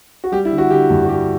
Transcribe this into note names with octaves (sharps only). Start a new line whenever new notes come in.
F#4
G3 G4
E4
D3
F#4
D3 G4
G2
F#4
G3 G4